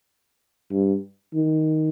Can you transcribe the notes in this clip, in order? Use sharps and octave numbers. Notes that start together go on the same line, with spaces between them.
G2
D#3